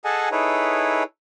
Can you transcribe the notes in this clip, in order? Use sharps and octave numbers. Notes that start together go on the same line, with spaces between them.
G#4 A4 D#5 F#5 G#5 A5
D#4 E4 G#4 A4 B4 C#5